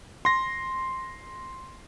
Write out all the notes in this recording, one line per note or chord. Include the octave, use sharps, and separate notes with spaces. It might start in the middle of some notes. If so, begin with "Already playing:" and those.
C6 A#6